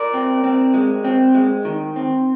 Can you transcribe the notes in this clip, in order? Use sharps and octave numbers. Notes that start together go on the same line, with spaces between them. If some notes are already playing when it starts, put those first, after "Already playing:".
Already playing: A#4 D5
C4
C4
G#3
C4
G#3
D#3
C4